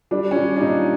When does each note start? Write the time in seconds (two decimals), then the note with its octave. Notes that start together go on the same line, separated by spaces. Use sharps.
0.11 G3 D4
0.31 C#4
0.36 G3 D4
0.56 D4
0.61 A#2 D#4